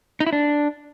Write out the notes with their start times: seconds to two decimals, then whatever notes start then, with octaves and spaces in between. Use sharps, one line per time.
0.20 D#4
0.27 E4
0.33 D4